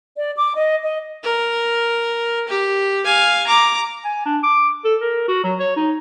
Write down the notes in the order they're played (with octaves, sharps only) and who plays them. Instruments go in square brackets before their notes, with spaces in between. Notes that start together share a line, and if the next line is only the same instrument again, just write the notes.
[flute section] D5
D6
D#5
D#5
[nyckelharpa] A#4
G4
F5 G#5
A#5 D6
[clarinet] G#5
D4
D6
A4
A#4
F#4
F#3
C#5
D#4